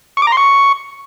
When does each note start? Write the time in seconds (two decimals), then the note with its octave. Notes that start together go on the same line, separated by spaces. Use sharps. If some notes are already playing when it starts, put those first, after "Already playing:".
0.17 C#6
0.22 D6
0.27 A#5
0.32 C6
0.37 C#6